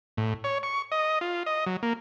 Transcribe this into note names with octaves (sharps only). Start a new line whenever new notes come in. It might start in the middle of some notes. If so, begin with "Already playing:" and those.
A2
C#5
C#6
D#5
F4
D#5
F#3
A#3